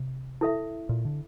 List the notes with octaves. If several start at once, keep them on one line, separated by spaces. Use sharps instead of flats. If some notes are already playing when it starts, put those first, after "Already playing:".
Already playing: C3
E4 A4 E5
A#2
D3